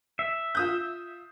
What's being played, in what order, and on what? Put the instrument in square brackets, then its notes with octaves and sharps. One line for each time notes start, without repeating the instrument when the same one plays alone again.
[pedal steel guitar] E5
[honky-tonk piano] F4 D#6 G6